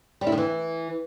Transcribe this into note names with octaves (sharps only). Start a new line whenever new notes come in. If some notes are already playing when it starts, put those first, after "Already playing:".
G3
E4
D#3
E3